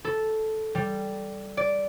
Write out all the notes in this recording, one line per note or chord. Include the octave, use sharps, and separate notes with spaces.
A4
G3
D5